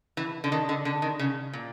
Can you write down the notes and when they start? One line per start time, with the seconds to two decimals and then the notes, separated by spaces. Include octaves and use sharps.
0.17 E3
0.44 D3
0.52 D#3
0.69 D3
0.85 D3
1.02 D#3
1.19 C#3
1.53 A#2